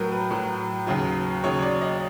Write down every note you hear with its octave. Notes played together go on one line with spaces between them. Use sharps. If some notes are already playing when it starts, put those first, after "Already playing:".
Already playing: A2 F#3 A#4 B4
B4
A2 F#3
D#2 C#3 F#3
D#2 C#3 F#3 C#5
D5
D#5